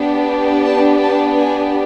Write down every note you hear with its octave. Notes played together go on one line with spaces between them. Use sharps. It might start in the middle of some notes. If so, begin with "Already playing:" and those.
Already playing: B3 D4 G4
A5
A5
G#5